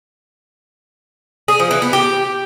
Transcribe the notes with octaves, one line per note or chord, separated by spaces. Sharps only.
G#4
F3
E3
B3
G4